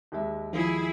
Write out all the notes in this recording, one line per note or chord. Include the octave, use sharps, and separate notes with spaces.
D#2 G#3 E5
D#3 F3 E4 G#4